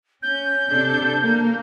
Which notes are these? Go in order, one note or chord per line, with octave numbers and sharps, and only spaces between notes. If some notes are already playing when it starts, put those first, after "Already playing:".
C#4 G6
C3 D4 A4
A#3